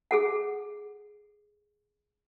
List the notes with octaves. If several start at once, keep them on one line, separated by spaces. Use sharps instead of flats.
G#4 A4 F#5